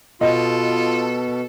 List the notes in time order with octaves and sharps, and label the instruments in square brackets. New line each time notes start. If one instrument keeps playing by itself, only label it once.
[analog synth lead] B2 [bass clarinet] F4 [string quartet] A4 [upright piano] D#5